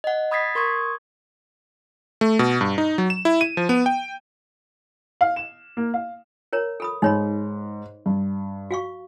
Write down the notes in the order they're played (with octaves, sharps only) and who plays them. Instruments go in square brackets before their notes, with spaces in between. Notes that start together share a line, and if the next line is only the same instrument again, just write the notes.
[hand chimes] D#5 F#5
B5 D#6 G#6 A6 B6 C7
A#4 C6 C#6 D#6 G#6
[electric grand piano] A3
B2
G2
D#4
F#3
E7
E4
D#7
F3
B3
G5
[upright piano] F5
E7
A#3
F5
[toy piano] A#4 C#5 A#5
A4 B5 D#6
[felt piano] G#2 [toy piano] D#4 C#5 B5
[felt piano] G2
[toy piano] F#4 F5 C#6